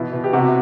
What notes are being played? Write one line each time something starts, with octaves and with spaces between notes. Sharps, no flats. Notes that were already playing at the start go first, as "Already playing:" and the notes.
Already playing: B2 E3 E4
B2
G4
C3 F#4